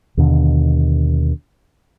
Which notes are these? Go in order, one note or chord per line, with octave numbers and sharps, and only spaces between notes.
D#2 B2 D3